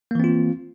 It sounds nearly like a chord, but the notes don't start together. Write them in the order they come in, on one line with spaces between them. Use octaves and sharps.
A#3 E3 C4 F4